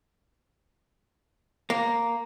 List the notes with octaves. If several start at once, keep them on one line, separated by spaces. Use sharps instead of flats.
A#3